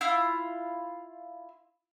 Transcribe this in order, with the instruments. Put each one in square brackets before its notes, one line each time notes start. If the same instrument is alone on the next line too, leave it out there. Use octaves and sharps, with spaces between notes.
[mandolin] E4 F4